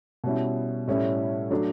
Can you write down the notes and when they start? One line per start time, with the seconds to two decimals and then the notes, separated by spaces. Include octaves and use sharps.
0.24 B2 G3 C#4 E4
0.87 A2 G3 C#4 E4
1.50 F#3 A3 D4